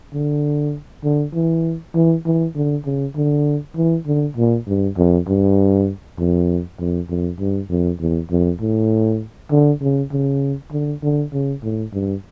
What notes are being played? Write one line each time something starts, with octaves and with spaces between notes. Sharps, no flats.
D3
D3
E3
E3
E3
D3
C#3
D3
E3
D3
A#2
G2
F2
G2
F2
F2
F2
G2
F2
E2
F2
A2
D3
C#3
C#3
D3
D3
C#3
A2
G2